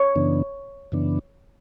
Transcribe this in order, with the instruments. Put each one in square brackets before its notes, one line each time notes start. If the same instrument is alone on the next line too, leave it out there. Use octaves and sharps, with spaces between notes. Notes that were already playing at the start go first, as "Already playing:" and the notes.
Already playing: [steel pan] C#5
[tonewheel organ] F#2 C#3 E3 B3 D4
F#2 C#3 E3 B3 D4